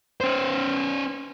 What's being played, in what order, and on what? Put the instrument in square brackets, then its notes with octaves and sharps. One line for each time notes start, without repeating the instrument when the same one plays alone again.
[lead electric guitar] C#4 C5